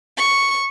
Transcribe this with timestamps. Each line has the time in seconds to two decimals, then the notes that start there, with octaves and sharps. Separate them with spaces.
0.17 C#6